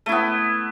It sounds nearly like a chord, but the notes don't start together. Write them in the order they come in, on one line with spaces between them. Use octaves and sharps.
A3 E4 B3